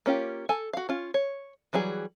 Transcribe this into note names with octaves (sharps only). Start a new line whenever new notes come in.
A#3 C#4 F4 G4
A4 G#5
F#4 F5
C#4 F4
C#5
E3 F#3 G3 G#4